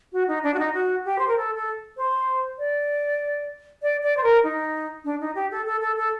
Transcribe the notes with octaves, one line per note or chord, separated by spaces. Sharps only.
F#4
D#4
D4
F#4
D#4
F#4
G4
C5
A#4
A4
A4
C5
D5
D5
D5
C5
A#4
D#4
D4
D#4
G4
A4
A4
A4
A4